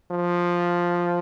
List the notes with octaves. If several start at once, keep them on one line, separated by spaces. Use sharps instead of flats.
F3